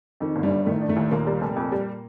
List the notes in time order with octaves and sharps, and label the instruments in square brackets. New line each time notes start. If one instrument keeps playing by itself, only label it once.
[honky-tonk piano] F2 [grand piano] D#3
[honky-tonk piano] G1
[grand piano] G2 G3
[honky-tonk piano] G1
[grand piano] A2 A3 [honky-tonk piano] D#3
[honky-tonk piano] D4
[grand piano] A2 A3
[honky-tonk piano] D#2
[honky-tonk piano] D#2 [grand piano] A#2 A#3
[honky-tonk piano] G3
F1
F2
G3